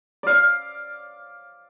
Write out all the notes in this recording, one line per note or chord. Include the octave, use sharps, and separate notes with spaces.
D5 F5